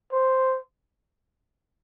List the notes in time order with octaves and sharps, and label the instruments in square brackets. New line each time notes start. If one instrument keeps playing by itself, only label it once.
[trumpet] C5